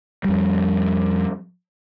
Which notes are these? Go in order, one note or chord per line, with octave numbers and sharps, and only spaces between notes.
F2 G3